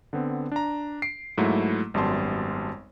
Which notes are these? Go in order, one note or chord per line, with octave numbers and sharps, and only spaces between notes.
D3 B3 C4
D4 A#5
C7 D7
G#2 F#3 A3 A#3 E4
G#1 F#2 G3 B3 A5 C6